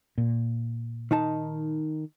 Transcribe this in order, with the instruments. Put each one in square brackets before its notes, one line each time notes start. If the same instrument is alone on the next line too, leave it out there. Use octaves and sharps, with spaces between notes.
[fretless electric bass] A#2
[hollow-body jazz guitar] D#3 D#4 A5